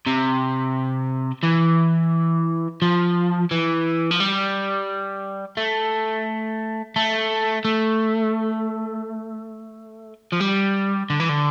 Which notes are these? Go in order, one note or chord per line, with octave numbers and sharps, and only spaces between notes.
C3
E3
F3
E3
F3
G3
A3
A3
A3
F3
G3
D3
E3
D3